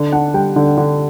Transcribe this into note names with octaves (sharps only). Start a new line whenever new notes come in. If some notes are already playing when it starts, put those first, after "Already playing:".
Already playing: D3
D4 F#5
G3 G5
D3
D3